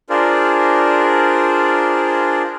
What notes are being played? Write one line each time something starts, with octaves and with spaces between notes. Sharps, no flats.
D4 F4 G#4 A#4 C5 D5